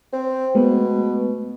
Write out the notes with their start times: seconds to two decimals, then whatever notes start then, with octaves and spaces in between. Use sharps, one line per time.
0.13 C4
0.55 B2 G#3 A3 B3